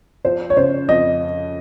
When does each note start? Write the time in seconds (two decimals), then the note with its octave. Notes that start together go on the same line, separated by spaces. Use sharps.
0.25 F3 C5
0.50 C#5
0.56 C#3 C5
0.88 F2 D#5